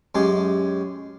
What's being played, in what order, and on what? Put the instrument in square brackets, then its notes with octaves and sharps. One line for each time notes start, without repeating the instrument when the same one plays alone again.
[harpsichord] F#2 G#3 C#4 G4